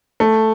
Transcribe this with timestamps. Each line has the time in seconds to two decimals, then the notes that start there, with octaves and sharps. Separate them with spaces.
0.20 A3